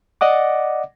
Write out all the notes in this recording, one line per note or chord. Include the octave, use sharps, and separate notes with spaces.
D5 D#5 F#5 D6